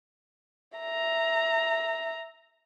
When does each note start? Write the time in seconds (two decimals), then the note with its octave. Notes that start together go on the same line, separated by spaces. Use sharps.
0.78 E5 A#5